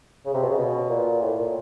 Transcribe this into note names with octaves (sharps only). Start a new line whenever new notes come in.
C#3
C3
B2
C#3
B2
A#2
A2
A#2